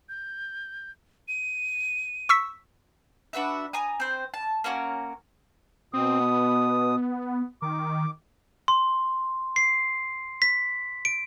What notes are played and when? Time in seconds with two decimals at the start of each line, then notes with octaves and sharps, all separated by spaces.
0.09 G6
1.28 D#7
2.29 C#6 E6 B6
3.33 D4 F#4 B4 E5
3.73 G#5 A#5 D#6
4.00 C4 C5
4.34 A5
4.64 A#3 C#4 F#4 A#4
5.93 B2 C4 D#6
6.20 B3
7.62 D#3 D6
8.68 C6
9.56 C7
10.42 B6
11.05 D7